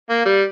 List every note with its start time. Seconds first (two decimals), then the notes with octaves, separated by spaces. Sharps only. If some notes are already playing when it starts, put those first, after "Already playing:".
0.10 A#3
0.25 G3